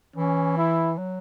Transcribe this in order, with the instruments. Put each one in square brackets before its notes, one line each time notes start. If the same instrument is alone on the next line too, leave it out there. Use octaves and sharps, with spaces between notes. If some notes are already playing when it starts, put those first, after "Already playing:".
[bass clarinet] E3 [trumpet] C#4
[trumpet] E4
[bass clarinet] F#3